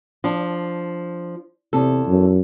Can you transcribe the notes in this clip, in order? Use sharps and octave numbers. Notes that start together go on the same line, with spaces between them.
F3 D4
E2 C3 A4
F#2